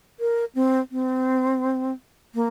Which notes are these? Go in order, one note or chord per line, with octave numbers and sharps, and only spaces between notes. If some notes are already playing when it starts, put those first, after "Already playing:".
A#4
C4
C4
A#3